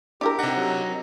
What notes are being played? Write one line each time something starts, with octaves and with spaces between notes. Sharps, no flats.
D4 E4 G4 A#4 D6
C3 D#4 F#5
F#3